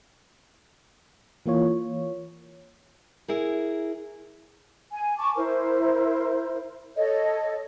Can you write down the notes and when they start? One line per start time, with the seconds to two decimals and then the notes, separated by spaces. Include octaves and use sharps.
1.46 E3 A#3 F4 C#5
3.28 E4 G#4 A#4
4.92 G#5
5.18 A5 C#6 D6
5.36 E4 A#4 C5
6.97 A4 C#5 D#5